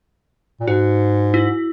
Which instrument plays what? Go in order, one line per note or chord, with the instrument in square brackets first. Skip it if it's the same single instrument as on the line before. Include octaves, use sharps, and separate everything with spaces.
[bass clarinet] A#2
[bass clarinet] G#2 [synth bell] F#4
[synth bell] E4